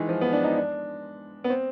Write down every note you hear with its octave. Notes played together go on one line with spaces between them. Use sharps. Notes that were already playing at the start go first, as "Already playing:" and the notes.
Already playing: D#3 E3 G#3
F3
B3
D4
D#4
D4
B3
C4